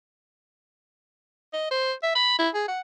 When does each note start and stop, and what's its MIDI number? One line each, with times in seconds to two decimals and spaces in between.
1.53 1.66 75
1.71 1.93 72
2.03 2.11 76
2.15 2.38 83
2.39 2.49 64
2.54 2.64 68
2.68 2.81 78